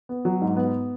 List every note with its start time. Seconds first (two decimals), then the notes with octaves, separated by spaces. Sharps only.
0.09 B3
0.25 F#3
0.41 G#2
0.57 B3